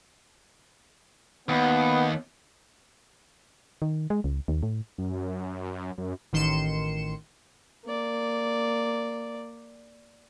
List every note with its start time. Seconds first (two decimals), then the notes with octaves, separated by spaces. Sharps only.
1.49 D#2 B3
3.82 D#3
4.10 G#3
4.24 C#2
4.48 D#2
4.63 A2
4.98 F#2
5.98 F#2
6.33 A1 D#3 C6 C#7 E7
7.85 A#3 D5